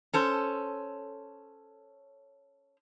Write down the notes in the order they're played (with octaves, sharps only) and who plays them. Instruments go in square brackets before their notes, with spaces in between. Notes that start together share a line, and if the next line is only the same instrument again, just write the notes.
[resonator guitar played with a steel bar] C#4 A4 C5